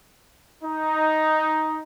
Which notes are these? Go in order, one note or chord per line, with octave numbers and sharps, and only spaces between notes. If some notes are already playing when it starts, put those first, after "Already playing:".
D#4